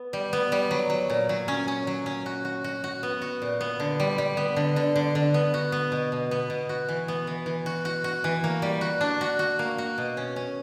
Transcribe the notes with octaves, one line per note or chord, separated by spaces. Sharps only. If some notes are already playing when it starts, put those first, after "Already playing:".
Already playing: B3
G3
B3
G3
F#3
F#3
A#2
F#3
C#4
C#4
F#3
C#4
F#4
F#4
F#4
F#4
B3
F#4
A#2
B3
D3
G3
G3
B3
D3
D3
D3
D3
B3
F#4
B3
B2
B2
B3
B2
F#4
E3
B3
E3
E3
F#4
F#4
F#4
E3
A#3
G3
F#4
D4
F#4
F#4
A#3
F#4
B2
C#4
C#4